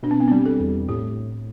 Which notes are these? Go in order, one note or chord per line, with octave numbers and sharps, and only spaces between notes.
B2 D4
C4
B3
C4
G3
A4
E2
A2 G4